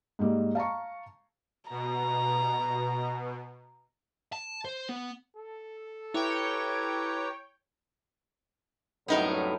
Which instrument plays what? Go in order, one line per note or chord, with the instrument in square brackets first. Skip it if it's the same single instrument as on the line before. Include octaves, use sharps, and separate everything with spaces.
[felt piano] G#2 G3 A#3
F5 A5 A#5 C#6
[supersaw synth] B2 [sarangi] A#5
[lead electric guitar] A5
C5
B3
[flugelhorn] A4
[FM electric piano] E4 [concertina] G4 B4 A#5 [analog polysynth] C#5 G5
[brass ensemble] C2 F#2 A2 [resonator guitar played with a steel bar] B3 D#4 A#4